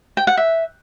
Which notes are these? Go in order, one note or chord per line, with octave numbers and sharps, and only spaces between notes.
G5
F#5
E5